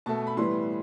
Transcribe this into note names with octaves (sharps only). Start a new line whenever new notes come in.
B2 A3 A5
B5
A2 E3 G3 B3 C6